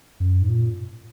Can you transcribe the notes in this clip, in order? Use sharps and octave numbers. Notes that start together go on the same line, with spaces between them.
F#2
G#2
A#2